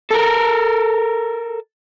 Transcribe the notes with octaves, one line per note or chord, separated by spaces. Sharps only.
A4 A#4